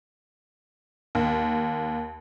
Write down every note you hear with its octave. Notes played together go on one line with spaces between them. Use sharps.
D#2